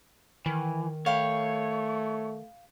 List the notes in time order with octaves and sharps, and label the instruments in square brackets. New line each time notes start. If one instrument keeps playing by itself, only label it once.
[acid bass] D#3 [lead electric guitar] E3
[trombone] A3 [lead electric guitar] C#5 [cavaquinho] F5 G5 B5